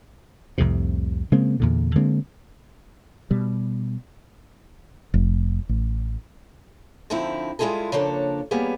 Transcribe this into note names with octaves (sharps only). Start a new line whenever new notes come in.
C2 F2 A2 C3
C#3 G#3 A#3 C4
E2 A#2 D3
D3 G#3 A#3 C4
B2 G3
F1
A1
D3 F3 C4 D#4 E4
G3 G#3 E4 F4 G#4 A4
C#3 F3 A#3 D4 A4 C#5
G3 A#3 B3 C#4 G4 G#4